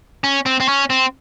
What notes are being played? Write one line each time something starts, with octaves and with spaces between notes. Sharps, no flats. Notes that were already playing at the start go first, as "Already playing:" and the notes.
C#4
C4
C4
C#4
C4